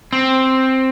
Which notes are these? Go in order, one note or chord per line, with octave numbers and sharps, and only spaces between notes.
C4